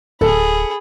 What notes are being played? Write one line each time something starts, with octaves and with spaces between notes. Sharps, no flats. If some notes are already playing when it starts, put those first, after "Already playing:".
D1 G#4 A4 B5